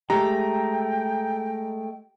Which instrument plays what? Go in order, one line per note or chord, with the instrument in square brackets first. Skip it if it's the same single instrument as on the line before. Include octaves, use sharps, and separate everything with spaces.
[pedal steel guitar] G#3 A3 [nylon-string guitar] G4 [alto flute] G5 [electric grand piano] A#5